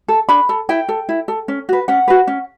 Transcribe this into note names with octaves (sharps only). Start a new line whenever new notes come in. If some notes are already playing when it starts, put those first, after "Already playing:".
A4
D4 B5
A4
E4 G5
A4
E4
A4
C#4
F#4 B4
C#4 F#5
F#4 B4
C#4